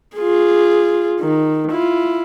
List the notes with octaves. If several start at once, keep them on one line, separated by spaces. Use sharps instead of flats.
F4 G#4
D#3
E4 F4